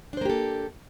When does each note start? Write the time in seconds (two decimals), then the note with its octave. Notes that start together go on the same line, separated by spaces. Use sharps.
0.13 D4
0.17 C5
0.21 A#3
0.25 G4
0.30 A4